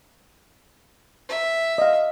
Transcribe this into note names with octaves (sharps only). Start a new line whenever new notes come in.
E5
D#5 F5